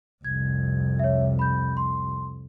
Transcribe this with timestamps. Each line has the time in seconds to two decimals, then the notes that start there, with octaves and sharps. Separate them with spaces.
0.24 C2 F2 G#6
0.99 C#5 E5
1.39 B5 G6
1.77 C6